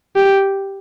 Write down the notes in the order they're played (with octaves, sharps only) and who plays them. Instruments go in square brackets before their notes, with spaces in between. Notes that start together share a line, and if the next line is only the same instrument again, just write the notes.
[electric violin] G4